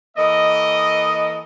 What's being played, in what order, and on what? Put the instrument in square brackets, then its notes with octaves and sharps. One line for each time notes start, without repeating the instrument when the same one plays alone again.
[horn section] E3 A#3 A4 D#5